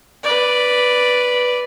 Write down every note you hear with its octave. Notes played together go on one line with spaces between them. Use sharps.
B4 D5